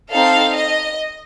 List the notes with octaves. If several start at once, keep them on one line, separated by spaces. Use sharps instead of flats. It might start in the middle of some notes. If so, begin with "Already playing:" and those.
C4 D#4 A4 F5
D#5